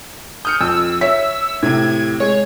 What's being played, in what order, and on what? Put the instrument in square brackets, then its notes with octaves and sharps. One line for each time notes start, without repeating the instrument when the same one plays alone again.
[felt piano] D#6 F6 C#7 [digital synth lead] G6
[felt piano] F2 [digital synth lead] E6
[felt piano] C#5 E5 B6
[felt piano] A2 C3 [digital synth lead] G#6
[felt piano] G#3 [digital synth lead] C#5